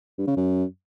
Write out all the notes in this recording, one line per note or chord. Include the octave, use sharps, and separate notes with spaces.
G2
C#3
F#2